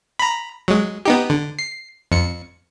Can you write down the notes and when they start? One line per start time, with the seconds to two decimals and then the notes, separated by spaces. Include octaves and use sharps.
0.19 A#5 B5
0.68 F#3 G#3
1.05 B3 D#4 G4
1.30 D3
1.59 C7
2.12 F2 C#7